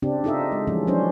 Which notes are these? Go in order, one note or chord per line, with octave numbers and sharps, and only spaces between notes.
C#3 C4 D4 G4
D#4 F4 A4 D#5 E5
G#3
E3 F3 G3 G#3 C#4
F3 F#3 C#4 D4 C5